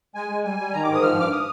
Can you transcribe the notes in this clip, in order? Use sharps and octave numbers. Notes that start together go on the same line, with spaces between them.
G#3 G#5
G#3
G3 G#5
G3
D#3 A#5
D6
G#2 D#6
F3 F6
G2 D6
D#6